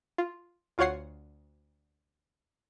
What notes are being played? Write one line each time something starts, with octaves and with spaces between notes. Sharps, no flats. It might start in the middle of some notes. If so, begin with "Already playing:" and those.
F4
D2 F4 F#4 C#5 F#5 C7